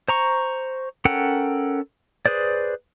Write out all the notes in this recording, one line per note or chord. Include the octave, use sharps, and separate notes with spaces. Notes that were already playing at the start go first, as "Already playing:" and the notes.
C5 A#5 C#6
C#4 A4 A#4 F#5 G5
G#4 B4 C5 D5